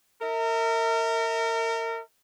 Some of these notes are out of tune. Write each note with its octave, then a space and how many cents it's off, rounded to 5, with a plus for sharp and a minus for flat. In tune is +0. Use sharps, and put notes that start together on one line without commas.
A#4 -30 E5 -35